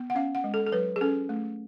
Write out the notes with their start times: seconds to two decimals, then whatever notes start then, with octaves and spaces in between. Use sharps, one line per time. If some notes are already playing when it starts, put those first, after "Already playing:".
Already playing: B3
0.10 F#5
0.15 C#4 F5
0.35 F#5
0.44 G#3
0.54 A4
0.66 A4
0.72 F#3 B4
0.96 G#4
1.01 C#4 A4
1.29 A3